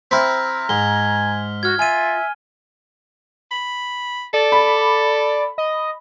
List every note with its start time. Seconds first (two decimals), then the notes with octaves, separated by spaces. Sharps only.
0.11 C4 E4 A#5 F6 B6
0.69 G#2 G#5 G7
1.63 F#4 F6 G#6
1.79 F4 E5 G#5 D#7
3.51 B5
4.34 A4 D5
4.52 B5
5.58 D#5